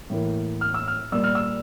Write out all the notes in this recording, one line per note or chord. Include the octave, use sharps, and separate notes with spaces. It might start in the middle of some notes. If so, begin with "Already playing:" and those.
A2 E3 A#3
F6
E6
F6
A#2 G3 A#3 E6
F6
E6